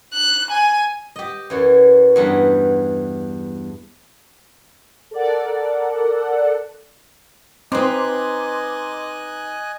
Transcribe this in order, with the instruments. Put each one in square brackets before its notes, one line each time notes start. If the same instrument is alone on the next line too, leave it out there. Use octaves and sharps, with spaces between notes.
[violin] F#6
G#5
[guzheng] G4 D#5
F#2 E3 C#5
E2 G2 F#5 A#5 B5
[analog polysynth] A4 A#4 D5 F#5
[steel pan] C4 [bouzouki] D#4 B4 [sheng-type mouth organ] D#5 G#5 F#6 [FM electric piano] C6 D6